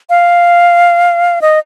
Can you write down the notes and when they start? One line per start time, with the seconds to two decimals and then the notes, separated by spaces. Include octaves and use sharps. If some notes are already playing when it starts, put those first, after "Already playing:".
0.10 F5
1.42 D#5